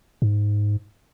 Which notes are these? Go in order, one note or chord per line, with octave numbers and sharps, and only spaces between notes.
G#2